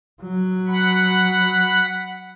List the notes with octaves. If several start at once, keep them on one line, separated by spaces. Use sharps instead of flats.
F#3
F#5 B5